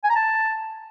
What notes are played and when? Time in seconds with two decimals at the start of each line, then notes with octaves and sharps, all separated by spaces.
0.04 G#5
0.10 A#5
0.16 A5